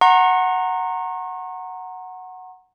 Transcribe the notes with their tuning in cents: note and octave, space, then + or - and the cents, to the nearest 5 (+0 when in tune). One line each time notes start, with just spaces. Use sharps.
F#5 +0 A#5 -5 C#6 -45